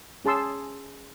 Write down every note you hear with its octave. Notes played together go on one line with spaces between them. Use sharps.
C#4 G#4 A5 C6 E6